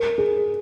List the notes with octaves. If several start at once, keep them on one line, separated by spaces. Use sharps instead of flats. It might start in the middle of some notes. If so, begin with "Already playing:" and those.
Already playing: A#4
G#4